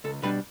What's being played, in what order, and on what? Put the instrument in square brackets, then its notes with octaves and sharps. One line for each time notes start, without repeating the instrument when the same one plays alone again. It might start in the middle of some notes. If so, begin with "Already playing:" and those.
[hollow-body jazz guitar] C#2 A4
B2 G3 D4 B4